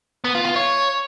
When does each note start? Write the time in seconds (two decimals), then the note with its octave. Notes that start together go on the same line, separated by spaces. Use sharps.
0.24 B3
0.35 F4
0.45 F4
0.56 C#5